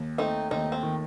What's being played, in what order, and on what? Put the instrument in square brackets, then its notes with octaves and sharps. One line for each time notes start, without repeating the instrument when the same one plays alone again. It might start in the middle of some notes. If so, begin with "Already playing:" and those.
Already playing: [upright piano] D#2
[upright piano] A3 [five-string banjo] C4 D#4
[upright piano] D#2 [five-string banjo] C4 D#4
[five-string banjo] C4
[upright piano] D#3